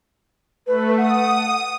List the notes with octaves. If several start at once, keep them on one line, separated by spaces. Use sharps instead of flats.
A3 B4
F#5 D#6